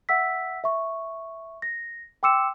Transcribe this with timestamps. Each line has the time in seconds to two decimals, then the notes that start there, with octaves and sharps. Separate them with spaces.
0.09 E5 F#5 E6 B6
0.64 E5 C#6
1.62 A#6
2.23 G5 C6 D6 E6 C#7 E7